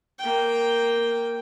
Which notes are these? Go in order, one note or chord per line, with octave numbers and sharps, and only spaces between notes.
A#3 G5